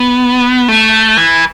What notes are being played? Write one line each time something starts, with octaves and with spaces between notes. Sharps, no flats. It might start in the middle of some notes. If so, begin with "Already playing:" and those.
Already playing: B3
A3
E3